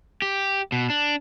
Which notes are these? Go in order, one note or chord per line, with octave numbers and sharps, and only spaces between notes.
G4
B2
D4